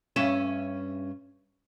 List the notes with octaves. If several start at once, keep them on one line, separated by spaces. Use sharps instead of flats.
G2 C#4 E5